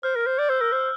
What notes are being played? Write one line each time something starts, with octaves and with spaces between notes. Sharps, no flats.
C5 F6
A#4
F6
C5
D5 G6
C5 E6
A#4 E6
C5 F6